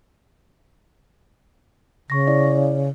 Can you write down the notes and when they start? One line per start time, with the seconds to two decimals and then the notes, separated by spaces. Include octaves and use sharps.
2.10 C#3 C#6 A#6
2.28 E4 D5